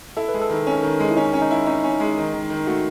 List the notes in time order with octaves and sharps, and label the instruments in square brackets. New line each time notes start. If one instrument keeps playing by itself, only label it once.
[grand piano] E4 [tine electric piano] A4
[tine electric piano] B4
[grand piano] G#3
[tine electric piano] A4
[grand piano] D#3 [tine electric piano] D#4
[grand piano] C#4
D#3
G#3
[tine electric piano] E4
[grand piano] C#4 [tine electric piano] D#4
[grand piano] C#4
[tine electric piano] D#4
[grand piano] E4
[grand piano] C#4 [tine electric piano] D#4
[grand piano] C#4
G#3
D#3
D#3
D#3
[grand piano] A3 [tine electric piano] F#4